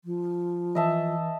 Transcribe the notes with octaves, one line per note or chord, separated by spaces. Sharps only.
F3
E3 D#5 E5 A5